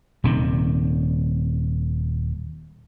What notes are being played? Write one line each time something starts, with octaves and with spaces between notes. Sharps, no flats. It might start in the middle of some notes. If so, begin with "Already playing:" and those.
D#1 C3 D#3